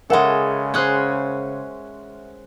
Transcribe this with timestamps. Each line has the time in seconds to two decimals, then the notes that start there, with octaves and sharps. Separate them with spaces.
0.10 C#3 G#3 A4 A#4 E5 F#5
0.74 C#4 G#4 C5 F#6 G6